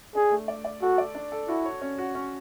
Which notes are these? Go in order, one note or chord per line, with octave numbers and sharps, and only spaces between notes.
D4 G#4
A3
D5
D5
F#4 A4
D5
D4
A4
E4 F#4
C#5
C#4
F#4
C#4